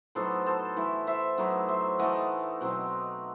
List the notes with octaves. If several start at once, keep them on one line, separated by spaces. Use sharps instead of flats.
A2 F#3 B3 D#4 A4 C5
A4 C5
E3 A3 E4
C5 E5
A2 F#3 B3 D#4
C5 E5
E3 A3 D#4 D#5 F#5
B2 F#3 C4 D#4